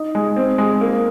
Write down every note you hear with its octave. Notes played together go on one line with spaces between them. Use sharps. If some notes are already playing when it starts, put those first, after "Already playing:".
Already playing: D#4
G#3
C4
G#3
A#3